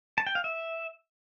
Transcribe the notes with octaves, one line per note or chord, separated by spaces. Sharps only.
A5
G5
F5
E5